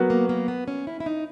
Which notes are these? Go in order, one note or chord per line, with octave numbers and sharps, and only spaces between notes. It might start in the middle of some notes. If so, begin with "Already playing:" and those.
Already playing: F#3 B3 F#4 A#4
A#3
A#3
B3
C#4
E4
E4
D#4